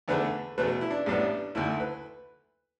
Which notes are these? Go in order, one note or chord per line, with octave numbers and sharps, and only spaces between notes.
E2 D3 A3 B4
E2 B2 A3 B4
E4
D4
A1 A2 G3 B3 D4
D2 D3 A3 E4
B4